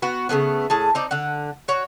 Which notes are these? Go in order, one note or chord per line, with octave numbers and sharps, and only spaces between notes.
B3 F#4 B4
C#3 F#3 A3 B3
A2 G#4 A5
C4 D#4 D5
D3 F#5
F#4 C#5